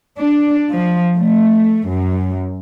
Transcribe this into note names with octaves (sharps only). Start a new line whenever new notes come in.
D4
F3
A3
F#2